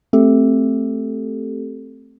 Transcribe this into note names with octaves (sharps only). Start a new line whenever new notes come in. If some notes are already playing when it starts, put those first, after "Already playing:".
A3 C4 G4 A4